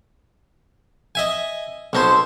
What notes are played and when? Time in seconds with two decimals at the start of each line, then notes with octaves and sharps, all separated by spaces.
1.15 D#5 E5 G#5
1.93 B1 C#4 A4 C5 A#5 C6